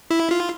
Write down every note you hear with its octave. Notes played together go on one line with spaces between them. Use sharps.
E4
F4